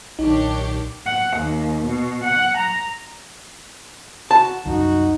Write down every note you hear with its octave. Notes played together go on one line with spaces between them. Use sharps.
B1 A#2 D#3 D4 D#4 G4 C#5
F#5
D#2
B2
F#5
A#5
F#4 A5
C2 F#2 D#4 F#4